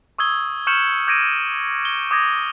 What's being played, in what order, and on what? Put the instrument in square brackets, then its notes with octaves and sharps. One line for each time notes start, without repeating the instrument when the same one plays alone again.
[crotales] C#6 D#6 E6 G#6 G7
C#6 F6 G6 C#7 E7 F#7
D6 G6 G#6 A#6 D7 D#7
G7
D6 D#6 G6 G#6 A#6